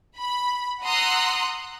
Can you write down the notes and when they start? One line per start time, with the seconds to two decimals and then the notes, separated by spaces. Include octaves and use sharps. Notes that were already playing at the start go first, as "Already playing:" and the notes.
0.18 B5
0.83 F#5 A#5 C6 D#6 E6 F#6